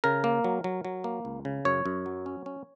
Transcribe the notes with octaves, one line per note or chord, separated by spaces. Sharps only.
C#3 A#4
A#3
F#3
F#3
F#3
A#3
C#2
C#3
F#2 C#5
F#2
F#3
C#4
C#4